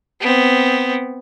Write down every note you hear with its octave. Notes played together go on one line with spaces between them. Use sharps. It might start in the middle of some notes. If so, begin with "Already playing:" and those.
B3 C4